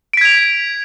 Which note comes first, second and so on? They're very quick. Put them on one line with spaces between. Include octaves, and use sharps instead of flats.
D7 B6 G#6 F7